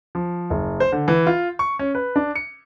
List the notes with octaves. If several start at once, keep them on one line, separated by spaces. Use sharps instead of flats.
F3
F#1
C5
D3
E3
F4
C#6
C#4
B4
D4
C#7